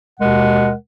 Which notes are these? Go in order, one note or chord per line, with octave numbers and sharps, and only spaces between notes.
D#2 B2 G#3 A#4 F#5